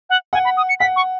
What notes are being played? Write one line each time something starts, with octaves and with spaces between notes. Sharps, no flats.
F#5
F#5 G#5
B5
D#6
C#7
F#5 B6
C#6